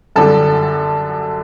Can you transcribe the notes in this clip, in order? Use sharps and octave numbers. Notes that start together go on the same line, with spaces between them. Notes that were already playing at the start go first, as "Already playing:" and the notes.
F#2 D3 G3 A4